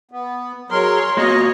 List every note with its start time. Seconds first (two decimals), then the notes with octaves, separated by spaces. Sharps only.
0.11 B3
0.70 F#3 G#3 A#4 C#5 C6
1.17 A#3 F4 F#4 C#5 D#5